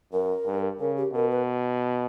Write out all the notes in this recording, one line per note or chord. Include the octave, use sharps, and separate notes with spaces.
F#2 A#4
G2
C#3 A#4
G4
B2 A#4
B4